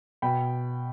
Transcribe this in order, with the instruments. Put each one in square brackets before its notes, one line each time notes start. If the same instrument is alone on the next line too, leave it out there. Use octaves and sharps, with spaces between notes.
[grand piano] B2 G5 B5